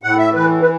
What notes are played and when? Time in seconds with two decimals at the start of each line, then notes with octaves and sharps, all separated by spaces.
0.03 A2 F#5
0.18 E5
0.34 E3 B4
0.62 B4